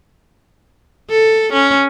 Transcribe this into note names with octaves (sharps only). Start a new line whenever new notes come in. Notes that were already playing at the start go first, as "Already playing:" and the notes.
A4
C#4